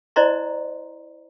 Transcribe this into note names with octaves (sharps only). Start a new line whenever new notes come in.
E4 C5 D5 D#5 A#5 C6